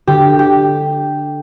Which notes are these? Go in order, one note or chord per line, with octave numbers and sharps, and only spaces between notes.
D3 G4
G4